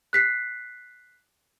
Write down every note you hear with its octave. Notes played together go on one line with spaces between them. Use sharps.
F#6 B6 C7